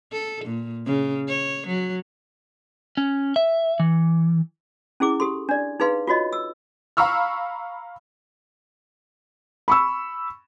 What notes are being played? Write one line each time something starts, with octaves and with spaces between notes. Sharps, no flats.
A4
A#2
C#3
C#5
F#3
C#4
E5
E3
C#4 E4 G#4 D6
G4 A4 C6
D4 D5
D#4 G#4 B4 F5 C6
F4 F#4 C#5 D#5
E6
F5 A#5 B5 C#6 E6 F6
B5 C#6 E6